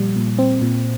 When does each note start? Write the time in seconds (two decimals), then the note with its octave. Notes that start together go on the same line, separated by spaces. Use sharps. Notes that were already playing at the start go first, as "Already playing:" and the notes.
Already playing: A#2 F3 G3
0.16 A#2
0.38 C4
0.62 A#2